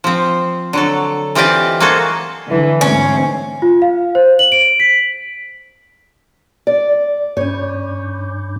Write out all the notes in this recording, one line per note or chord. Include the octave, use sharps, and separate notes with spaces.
F3 C4
D3 F#3 A4
E3 C4 F4 G4 D5 D#5
A#3 C4 F#4 G#4 A4
D3 E3
D2 G#2 C4 C#4
F4
F5
C5
F#7
D7
B6
D5
G2 C#4 C#5